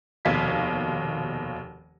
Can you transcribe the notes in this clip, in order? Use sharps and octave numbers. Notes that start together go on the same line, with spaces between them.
F1 D#2 B2 F5 G#6 B6